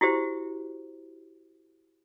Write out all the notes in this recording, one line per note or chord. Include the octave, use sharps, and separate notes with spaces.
E4 F#4 G4 C5